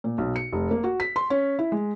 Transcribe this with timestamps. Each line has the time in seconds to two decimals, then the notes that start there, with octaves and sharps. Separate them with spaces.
0.04 A#2
0.18 B1
0.36 C#7
0.52 F1
0.71 A#3
0.84 F#4
1.00 B6
1.16 C6
1.30 C#4
1.59 E4
1.72 G#3